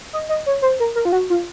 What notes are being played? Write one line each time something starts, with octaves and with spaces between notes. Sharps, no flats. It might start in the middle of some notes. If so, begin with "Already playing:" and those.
D#5
D#5
C#5
C5
A#4
A#4
F4
F#4
F4